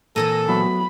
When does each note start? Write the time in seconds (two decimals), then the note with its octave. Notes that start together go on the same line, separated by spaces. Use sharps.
0.16 A#2 E3 C4 A4 A#6 D#7
0.48 F#3 A3 B3 B5